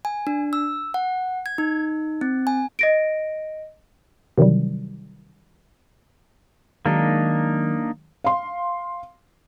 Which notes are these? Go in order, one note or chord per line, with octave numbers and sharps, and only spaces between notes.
G#5
D4
E6
F#5
G#6
D#4
C4
G#5
D#5 A#6 D7
C3 D#3 E3 F#3 G3
D#3 F#3 G#3 A#3 D4 D#4
F5 C6